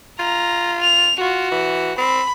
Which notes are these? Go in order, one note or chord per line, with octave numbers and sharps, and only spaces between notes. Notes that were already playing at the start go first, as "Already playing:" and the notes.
F4 A#5
F7
F4 F#4
E3
C4 B5